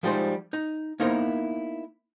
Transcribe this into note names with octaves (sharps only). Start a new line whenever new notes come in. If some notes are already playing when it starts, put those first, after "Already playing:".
F3 G3 G#3 D#4 C5
D#4
A#3 B3 D#4 E4 A#4 C5